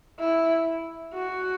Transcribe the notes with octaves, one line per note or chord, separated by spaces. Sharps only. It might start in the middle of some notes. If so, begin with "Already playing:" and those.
E4
F#4